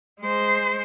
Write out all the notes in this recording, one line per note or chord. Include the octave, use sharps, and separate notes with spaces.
G#3 C5